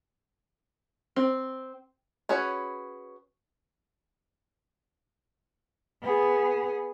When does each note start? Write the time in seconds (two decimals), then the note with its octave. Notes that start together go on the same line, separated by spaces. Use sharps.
1.16 C4
2.29 C#4 F#4 G#4 B4 C#5
6.02 B3 G#4